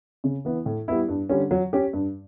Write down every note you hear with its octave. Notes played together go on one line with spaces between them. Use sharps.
C#3
E3 B3
A2
G3 B3 E4
G2
D3 G3 C#4
F#3
C#4 G4
G2